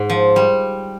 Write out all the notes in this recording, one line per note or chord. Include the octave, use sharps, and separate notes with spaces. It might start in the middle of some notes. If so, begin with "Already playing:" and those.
Already playing: G#2
F3
G3